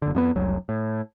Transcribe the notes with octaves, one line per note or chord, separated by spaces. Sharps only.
F#1 D3
F2 G#3 B3
F1 C2 F#3
A2